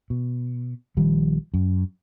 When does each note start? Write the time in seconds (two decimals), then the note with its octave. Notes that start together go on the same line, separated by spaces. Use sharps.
0.10 B2
0.97 A#1 D#3 F3 G3
1.54 F#2